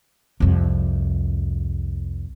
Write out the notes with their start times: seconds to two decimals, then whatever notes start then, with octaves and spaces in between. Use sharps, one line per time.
0.40 C2 F2